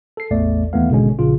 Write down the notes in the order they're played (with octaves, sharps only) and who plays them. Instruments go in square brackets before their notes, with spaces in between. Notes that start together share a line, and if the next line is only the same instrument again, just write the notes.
[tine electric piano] A4 C7
A1 E2 A3 D5
D#2 E3 A3 B3 F5
G#1 B2 D3 G#3 C#4
A#1 C#3 F4